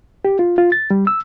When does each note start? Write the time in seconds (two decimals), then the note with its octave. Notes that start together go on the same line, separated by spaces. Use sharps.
0.25 G4
0.39 F4
0.58 F4
0.72 A6
0.91 G3
1.07 E6